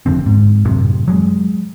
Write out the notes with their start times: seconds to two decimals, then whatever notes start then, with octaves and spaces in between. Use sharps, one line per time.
0.06 F#1 F2 D3 C4
0.26 G#2
0.65 F#2 A2 C3
1.08 F#3 G#3